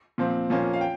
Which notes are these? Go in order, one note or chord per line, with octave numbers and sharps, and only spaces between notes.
A#2 F3 C4
A#2 F3 A#3 C#4
F5
G5